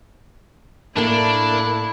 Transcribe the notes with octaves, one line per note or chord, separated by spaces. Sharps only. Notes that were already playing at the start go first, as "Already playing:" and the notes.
A2 A3 A#3 D4 E4 A#4